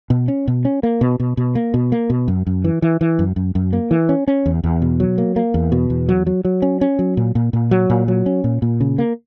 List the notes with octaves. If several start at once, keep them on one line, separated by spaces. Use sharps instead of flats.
B2
C#4
B2
C#4
A#3
B2
B2
B2
A#3
B2
A#3
B2
F#2
F#2
E3
E3
E3
F#2
F#2
F#2
A#3
E3
C#4
C#4
E2
E2
B2
F#3
A#3
A#3
E2
B2
E2
F#3
F#3
F#3
C#4
C#4
F#3
A#2
A#2
A#2
F#3
A#2
F#3
C#4
A#2
A#2
C#3
A#3